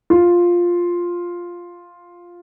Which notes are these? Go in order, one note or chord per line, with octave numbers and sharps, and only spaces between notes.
F4